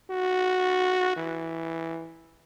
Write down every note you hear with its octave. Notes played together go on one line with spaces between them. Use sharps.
F#4
E3